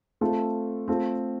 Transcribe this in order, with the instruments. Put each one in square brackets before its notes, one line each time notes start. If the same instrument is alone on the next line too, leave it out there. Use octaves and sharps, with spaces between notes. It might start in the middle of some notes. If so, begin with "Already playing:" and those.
[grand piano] A3 C4 F4 A4
A3 C4 F4 A4